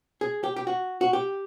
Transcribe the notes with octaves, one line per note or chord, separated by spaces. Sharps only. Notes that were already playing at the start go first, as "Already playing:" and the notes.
G#4
G4
G4
F#4
F#4
G4